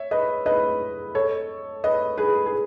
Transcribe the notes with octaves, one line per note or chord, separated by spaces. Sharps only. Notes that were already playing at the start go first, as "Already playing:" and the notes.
Already playing: C#5 E5
B4 D#5
B4 D#5
A4 C#5
B4 D#5
G#4 B4
G#4